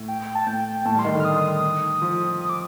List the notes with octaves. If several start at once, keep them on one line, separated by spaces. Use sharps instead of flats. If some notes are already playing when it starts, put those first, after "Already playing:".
Already playing: A2
G5
A5
A2 G5
G5
A2 A5
G3
C6
D#3
D3 C6
F6
D#6
F3
D#6
D6